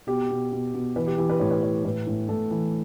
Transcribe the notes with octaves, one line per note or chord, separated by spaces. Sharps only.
B2 G4
B2
B2
B2
E3 B4
G4
E3 G4
B4
A2 C#5
B4
E3 C#5
A2 B4
A2
A2 A4
E3